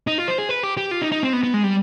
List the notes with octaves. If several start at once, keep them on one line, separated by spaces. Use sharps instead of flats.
D#4
F4
C5
G#4
B4
G4
G4
F4
D#4
D#4
C4
B3
B3
G#3
G3